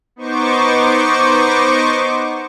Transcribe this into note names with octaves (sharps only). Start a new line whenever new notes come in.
B3 D#4 C5 C#6 D6